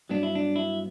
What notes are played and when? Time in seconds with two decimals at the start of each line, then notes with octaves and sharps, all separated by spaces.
0.09 G2 F#3 B3 D4
0.23 E4
0.35 D4
0.56 E4